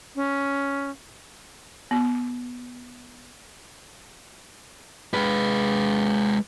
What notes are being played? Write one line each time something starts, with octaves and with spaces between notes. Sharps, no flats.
C#4
B3
G#3 B4